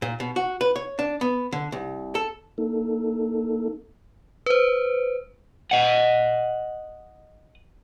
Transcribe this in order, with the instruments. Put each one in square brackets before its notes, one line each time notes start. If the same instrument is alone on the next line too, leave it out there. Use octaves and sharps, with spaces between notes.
[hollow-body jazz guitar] A#2
B2
F#4
B4
C#5
D4
B3
D3
C2
A4
[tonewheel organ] A#3 D#4 A4
[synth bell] B4 C5
[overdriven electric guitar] D#5 F#5